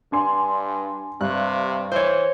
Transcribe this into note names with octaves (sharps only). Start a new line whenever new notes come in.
G2 D4 G#5 C6
G2 C3 F#6
E3 C5 C#5